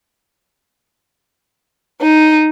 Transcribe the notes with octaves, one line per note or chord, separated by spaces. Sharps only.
D#4